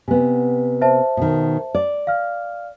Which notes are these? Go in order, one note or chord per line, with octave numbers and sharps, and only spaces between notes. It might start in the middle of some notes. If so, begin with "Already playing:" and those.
C3 B3 G#5
C5 E5 A5
B2 D#3
D5
F5 F6